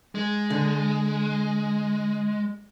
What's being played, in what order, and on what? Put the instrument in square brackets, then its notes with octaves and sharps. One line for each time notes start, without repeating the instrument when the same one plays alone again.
[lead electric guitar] G#3
[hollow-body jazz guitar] D3